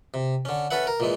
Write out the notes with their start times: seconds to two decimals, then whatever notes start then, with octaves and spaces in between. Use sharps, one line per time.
0.14 C3
0.45 D3 C#4
0.71 C#4 A4 B4 E5 F#5
0.87 A#4
1.00 A#2 E3 G#3